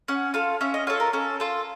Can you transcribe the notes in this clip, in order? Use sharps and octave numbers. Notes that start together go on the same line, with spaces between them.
C#4 F#5
F4 A4 F5
C#4 E5
D#5
F4 A4 C#5
A#4
C#4 A4
F4 A4